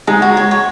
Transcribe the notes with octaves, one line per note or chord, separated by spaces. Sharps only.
G#3 D#4
F#4
C#5
C#5